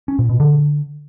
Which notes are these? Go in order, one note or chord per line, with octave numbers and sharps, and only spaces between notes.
C#4
A#2
B2
D3